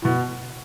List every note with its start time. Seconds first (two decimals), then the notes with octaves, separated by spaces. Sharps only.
0.02 A2
0.05 B2